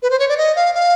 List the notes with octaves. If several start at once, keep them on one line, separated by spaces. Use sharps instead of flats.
B4
C5
C#5
D5
D#5
F5
F5